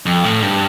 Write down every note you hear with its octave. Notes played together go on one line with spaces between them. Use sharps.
F2
A2
G2